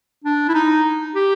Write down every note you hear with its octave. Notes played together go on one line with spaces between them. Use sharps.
D4
E4
D#4
G4